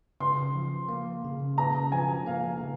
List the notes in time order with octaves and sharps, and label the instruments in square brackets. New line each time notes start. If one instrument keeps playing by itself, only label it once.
[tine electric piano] C#3 [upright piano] C6
[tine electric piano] F3
A#3
C#3
[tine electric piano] C#3 [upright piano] A#5
[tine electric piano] F3 [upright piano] G#5
[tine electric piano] A#3 [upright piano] F5
[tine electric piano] C#3